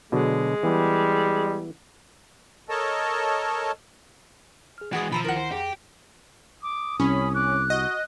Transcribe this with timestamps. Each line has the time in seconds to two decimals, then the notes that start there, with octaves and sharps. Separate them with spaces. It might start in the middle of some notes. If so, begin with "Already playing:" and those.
0.12 B2 D3 F#3 G#3
0.63 E3 G3 B3 G#4
2.69 A4 A#4 C#5 D#5 A5
4.78 G#4 F6
4.93 E3 G#3 F#4 G#4 D#6 G#6 A6
5.12 B2 D#3 F3 E5 A#5 B5
5.24 C#2 D#3 E4 A#4 F#5
5.37 C5
5.52 F2 G4 G#4 A#6
6.63 D6 D#6
7.00 C2 C#4 B5
7.34 D6 F#6
7.70 F#4 D#5